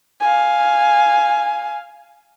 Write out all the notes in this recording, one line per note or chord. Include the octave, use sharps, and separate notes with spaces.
F5 G#5